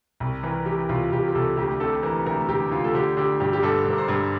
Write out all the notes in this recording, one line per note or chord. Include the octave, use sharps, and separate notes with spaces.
C2
E3 A#4
E3 G4
C2 F4
C2 G4
G4
C2 A4
D2 G4
C3 A4
E3 A#4
D2 A#4
D2 G4
D2 F4
A4
D3 G4
D3 G4
G2 G4
G4
G2 A4
G2 A#4
C5
G2